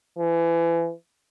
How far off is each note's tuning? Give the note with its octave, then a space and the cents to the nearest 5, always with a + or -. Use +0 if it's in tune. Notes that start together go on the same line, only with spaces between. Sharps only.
E3 +30